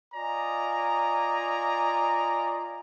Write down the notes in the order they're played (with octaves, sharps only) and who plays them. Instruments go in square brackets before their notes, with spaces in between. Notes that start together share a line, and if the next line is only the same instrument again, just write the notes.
[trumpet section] F4 D5 D#5 G#5 A#5